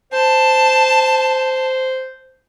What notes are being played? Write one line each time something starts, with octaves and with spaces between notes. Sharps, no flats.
C5 A5